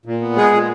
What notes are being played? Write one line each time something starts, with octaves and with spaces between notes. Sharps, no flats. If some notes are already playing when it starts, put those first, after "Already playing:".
A#2
B3
G#3 G#4
A#2